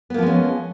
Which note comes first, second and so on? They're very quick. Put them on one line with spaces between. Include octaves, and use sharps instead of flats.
B3 A#3 F3 G#3 C#4